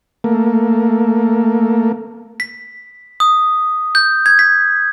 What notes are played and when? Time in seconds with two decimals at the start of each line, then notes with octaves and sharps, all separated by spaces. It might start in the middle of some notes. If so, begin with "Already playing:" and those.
0.24 A3 A#3
2.40 B6
3.20 D#6
3.95 G6
4.26 G#6
4.39 B6